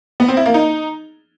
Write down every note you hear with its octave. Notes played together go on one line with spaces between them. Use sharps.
B3
C4
E4
A#3
D#4